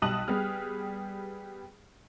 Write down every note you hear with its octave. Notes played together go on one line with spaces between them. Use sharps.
B1 G3 A5 D#6 F#6 F#7
G3 B3 G4 G#4 F6